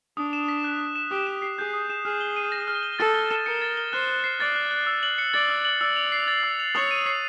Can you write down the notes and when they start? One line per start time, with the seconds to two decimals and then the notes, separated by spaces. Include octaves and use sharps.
0.17 D4 D#6
0.33 E7
0.48 B6
0.64 F#6
0.80 D#6
0.96 E7
1.11 G4 D#6
1.27 E7
1.42 C7
1.58 G#4 G6
1.74 D#6
1.90 E7
2.05 G#4 F6
2.21 G7
2.36 D#7
2.52 A#6
2.68 F6
2.83 G7
2.99 A4 A6
3.15 G7
3.31 E7
3.46 A#4 C#7
3.62 A6
3.77 G7
3.93 C5 F#6
4.09 F#6
4.24 C7
4.40 D5 A6
4.56 F#6
4.71 F#6
4.87 E6
5.03 F#7
5.18 C#7
5.34 D5 A6
5.50 E6
5.65 F#7
5.81 D5 E6
5.96 F7
6.12 C7
6.28 A6
6.43 E6
6.60 F7
6.75 C#5 D#6
6.91 D#7
7.06 C7